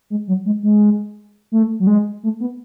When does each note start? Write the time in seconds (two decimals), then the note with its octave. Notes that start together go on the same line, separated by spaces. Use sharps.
0.10 G#3
0.28 F#3
0.45 G#3
0.63 G#3
1.52 A3
1.80 F#3
1.87 G#3
2.23 A3
2.40 B3